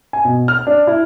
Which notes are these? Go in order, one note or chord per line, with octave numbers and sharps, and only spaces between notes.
G#5
B2
F6
D4
E4